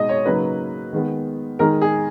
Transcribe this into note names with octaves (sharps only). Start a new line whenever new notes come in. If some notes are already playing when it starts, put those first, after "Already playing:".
Already playing: B2 G#3 D#4 D#5
C#5
C#3 F#3 A#3 D#4 B4
D#3 G#3 B3
D#3 G#3 D#4 A#4
G#4